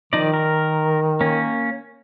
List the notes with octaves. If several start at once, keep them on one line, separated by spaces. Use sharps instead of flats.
D#3 F3 D#4 D5
A#4
A#3 C#4